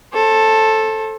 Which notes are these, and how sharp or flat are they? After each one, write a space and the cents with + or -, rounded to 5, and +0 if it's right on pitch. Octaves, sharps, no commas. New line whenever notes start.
A4 +0 C5 +40